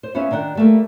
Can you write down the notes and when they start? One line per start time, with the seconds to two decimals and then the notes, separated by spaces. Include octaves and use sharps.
0.03 C5
0.15 B3 C#4 C5 C#5 E5 F5
0.31 D#3 D4 F#5 G5
0.55 G3 A3 A#3